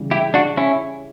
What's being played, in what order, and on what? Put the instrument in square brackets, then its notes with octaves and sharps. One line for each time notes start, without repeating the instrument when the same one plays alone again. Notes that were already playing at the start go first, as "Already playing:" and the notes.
Already playing: [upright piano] C#3 E3 G3
[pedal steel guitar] E4 G4
D4 F#4
C#4 E4